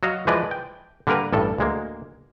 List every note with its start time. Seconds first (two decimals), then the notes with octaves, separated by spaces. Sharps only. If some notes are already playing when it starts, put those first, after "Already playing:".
0.03 F#3 F#4 D#5 F5
0.27 E3 F3 G#3 B4 D5 D#5
0.51 G5
1.07 D3 G3 A#3 A#4 B4
1.33 A1 G2 A4
1.58 D2 G#3 A#3